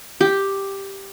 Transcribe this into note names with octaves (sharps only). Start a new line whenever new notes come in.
G4